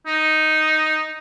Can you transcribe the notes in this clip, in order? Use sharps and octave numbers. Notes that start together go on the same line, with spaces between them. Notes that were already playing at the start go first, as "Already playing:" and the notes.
D#4